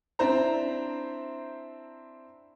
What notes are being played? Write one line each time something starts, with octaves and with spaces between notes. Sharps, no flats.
C4 D4 E4 C5 A#5